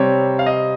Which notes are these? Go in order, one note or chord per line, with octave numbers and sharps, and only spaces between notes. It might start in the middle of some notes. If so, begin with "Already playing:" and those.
Already playing: C3 G3 C4 C#5
F5
D#5